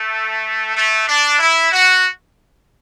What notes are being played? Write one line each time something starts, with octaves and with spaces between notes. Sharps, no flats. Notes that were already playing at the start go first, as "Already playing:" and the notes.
Already playing: A3
A3
D4
E4
F#4